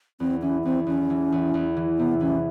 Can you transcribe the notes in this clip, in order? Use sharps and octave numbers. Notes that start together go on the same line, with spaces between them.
E2 C4
E3 C#4
E2 C4
E2 C#4
E3
E2
E2
E3
C3 B3
E3 C#4